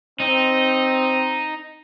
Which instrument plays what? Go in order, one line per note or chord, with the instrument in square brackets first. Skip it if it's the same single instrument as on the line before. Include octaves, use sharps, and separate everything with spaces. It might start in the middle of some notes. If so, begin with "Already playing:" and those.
[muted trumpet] C4 [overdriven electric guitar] D#4